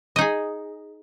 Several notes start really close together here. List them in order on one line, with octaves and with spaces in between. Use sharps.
D#5 D#4 G#4